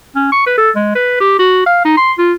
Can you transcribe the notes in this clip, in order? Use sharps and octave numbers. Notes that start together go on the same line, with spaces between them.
C#4
C#6
B4
A4
G#3
B4
G4
F#4
F5
D#4
C6
F4